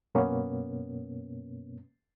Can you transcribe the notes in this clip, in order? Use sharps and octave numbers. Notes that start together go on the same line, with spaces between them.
F#2 B2 A#3 B3 C#4